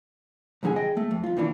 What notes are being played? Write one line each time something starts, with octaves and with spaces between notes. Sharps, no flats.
C2 F2 D3 G#4 G#5
G#4 D#5 G5
A3
F2
F2 F4
D#2 D#3 E3 D4